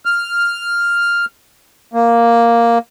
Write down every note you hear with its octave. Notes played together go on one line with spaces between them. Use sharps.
F6
A#3